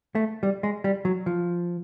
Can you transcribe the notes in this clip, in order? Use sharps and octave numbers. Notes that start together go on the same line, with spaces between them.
A3
G3
G#3
G3
F#3
F3